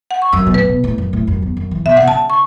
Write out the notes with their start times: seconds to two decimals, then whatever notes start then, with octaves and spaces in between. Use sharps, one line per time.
0.11 F#5
0.22 C#6
0.33 F#2 E6
0.47 B2
0.54 A2 B4
0.69 B2
0.84 A2
0.98 F#2
1.13 A2
1.27 F#2
1.42 E2
1.57 F#2
1.71 E3
1.86 B2 E5
1.97 B2 F#5
2.08 C#3 A5
2.30 C#6